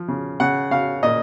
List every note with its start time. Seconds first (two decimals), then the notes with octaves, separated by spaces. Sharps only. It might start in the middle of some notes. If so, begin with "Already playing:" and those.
Already playing: F3
0.08 C#3
0.40 C#3 F#5
0.71 C#3 F5
1.03 A#2 D#5